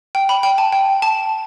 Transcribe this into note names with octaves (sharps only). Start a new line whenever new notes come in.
G5
B5
G5
A5
G5
A5